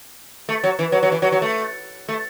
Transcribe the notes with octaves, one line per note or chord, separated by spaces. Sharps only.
A3
F#3
E3
F#3
F#3
E3
F#3
F#3
A3
A3